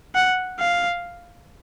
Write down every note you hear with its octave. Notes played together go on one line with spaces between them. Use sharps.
F#5
F5